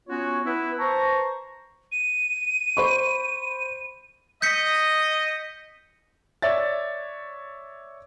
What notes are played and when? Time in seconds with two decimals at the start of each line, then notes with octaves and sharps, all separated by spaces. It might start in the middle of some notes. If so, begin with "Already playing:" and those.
0.08 B3 C#4 F4 F#4 C#5
0.46 B3 E4 B4
0.79 B4 C5 A5 A#5 C#6
1.92 D#7
2.77 C5 B5 C#6
4.42 D#5 G6 B6 C#7
6.42 C#5 D5 E5 A6